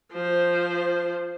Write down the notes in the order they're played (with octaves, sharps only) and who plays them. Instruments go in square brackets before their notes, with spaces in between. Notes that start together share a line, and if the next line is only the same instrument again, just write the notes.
[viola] F3 C5